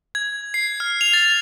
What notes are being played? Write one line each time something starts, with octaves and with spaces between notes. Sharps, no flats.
G#6
C7
F6
F7
A6